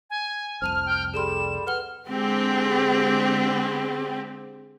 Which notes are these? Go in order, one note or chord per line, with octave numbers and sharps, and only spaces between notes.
G#5
F1 C2 F2 C5 A5 F6 D#7
G5
G3 G#4 A4 C6 E7
B4 F#5 F6 G7
D3 G#3 C4 G4